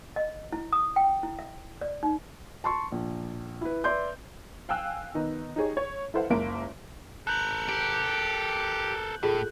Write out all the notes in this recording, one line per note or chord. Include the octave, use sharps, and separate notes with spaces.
D#5
E4
D#6
G5
E4
E5
D5
D#4
A5 C6 C#6
A#1
E4 B4
B4 D5 E5 C6 G6
F5 G5 G#5 E6 F#6
D#3 B3 D#4
D#4 G4 G#4 C#5
C#5
E4 A4 B4 C5 F5 F#5
F#1 C#2 A#3 E5 D7
A4 A#4 F#6 G6 F#7
G4
A2 F4 G#4 A4